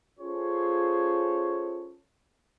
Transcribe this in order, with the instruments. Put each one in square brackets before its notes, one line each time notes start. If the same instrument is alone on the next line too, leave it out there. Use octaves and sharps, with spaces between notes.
[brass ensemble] C#4 F4 G#4 A4 C5 C#5